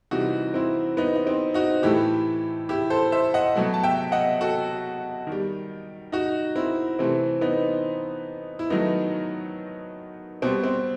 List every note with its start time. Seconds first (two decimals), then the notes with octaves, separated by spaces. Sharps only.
0.11 C3 E3 G3 D#4 F#4
0.54 C4 E4
0.97 B3 D#4
1.16 D#4
1.27 C4
1.54 D#4 F#4
1.83 A2 E3 A3 E4 G4
2.69 E4 G4
2.90 A4 C5
3.12 C5 E5
3.34 D#5 F#5
3.55 B2 F#3 A3
3.74 A5
3.83 E5 G5
4.12 D#5 F#5
4.41 F#4 A4
5.27 D#3
5.32 G3
6.12 D#4 F#4
6.56 C4 E4
6.99 C3 E3 A3 C4
7.41 B3 D#4
8.59 E4
8.70 D#3 F#3 A3 B3 D#4
10.42 B2 G3 C4
10.64 C4